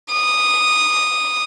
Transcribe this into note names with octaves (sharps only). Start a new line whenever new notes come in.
D#6